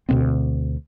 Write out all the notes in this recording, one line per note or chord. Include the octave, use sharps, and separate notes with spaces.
D2 B2 B3 C4